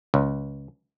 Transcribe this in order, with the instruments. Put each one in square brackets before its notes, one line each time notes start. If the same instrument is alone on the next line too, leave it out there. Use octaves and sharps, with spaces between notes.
[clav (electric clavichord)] C#2